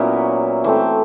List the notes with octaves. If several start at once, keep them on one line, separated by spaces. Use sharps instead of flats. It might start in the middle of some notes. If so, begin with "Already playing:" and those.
Already playing: A#2 F#3 B3 C#4 E4
E3 A3 C4